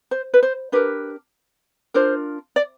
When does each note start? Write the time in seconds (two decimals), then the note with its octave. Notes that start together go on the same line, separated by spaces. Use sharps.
0.11 C5
0.34 B4
0.43 C5
0.72 D4 G4 A#4 B4
1.94 D4 F4 A#4 C5
2.56 D5